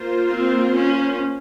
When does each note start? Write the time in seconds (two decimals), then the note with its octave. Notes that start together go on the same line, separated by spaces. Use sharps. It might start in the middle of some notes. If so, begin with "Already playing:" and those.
Already playing: A#3 F4 C5
0.30 C4
0.75 C#4